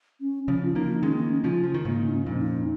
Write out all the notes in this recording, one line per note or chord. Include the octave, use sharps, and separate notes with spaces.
C#4
C#3 F3 C#4
F4
F3 A#3 D#4
D#3 G#3 C#4
A#3
C#4
C#3 F3 F4
F3
D#3
G#2 C#3 A#3
D#4
C#4
F2 A#2
D#4